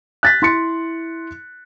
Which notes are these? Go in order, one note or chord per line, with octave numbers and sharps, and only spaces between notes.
F#6 A6 B6
E4 C6 A6 C#7